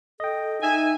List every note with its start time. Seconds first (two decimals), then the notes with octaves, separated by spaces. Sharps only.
0.20 A4 D#5 G5
0.62 D#4 E5 G#5